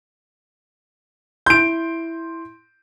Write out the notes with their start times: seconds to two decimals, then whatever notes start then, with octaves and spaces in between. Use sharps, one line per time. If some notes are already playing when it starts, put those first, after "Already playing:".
1.46 E4 C6 G6 D7